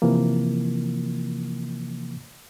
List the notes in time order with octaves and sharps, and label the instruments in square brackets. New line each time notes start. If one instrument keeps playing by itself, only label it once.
[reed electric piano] C3 E3 F3 A#3